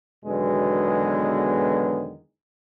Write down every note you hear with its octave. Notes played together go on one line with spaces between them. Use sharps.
E2 B2 D3 D#3 F#3 G#3